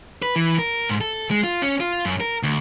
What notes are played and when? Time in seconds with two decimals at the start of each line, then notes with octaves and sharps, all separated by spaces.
0.22 B4
0.36 E3
0.59 A#4
0.89 G#2
1.01 A4
1.31 G#3
1.44 F4
1.62 C#4
1.80 F4
2.05 F#2
2.20 A#4
2.43 D2